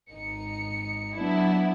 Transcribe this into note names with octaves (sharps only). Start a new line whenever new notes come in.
G#1 D#4 C#7
F#3 B3 D4 E4